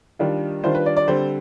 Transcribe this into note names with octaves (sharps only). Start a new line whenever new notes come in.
D#3 G3 D4 F4
D#3 G3 D4 F4 C5
B4
D5
D5
D3 G3 C4 C5